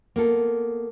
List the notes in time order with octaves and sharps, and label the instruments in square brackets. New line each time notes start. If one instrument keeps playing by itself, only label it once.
[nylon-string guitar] A#3 B3 A4